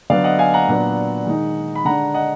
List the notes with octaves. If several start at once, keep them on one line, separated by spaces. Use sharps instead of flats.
D3 F#3 B3 D5 F5
D#5 F#5
F5 G#5
F#5 A#5
A#2 F#3 B3 D4
D#3 G#3 D#4
B5
D3 G#3 D4 F#5 A#5
D#5 F#5